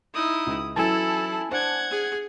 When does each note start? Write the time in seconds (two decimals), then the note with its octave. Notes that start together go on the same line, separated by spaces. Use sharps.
0.15 D#4 E4 D#6
0.46 C#2
0.76 E3 F#3 C#4 E4 A4 G#5 A5
1.51 D4 C5 F#5 G#6
1.91 G#4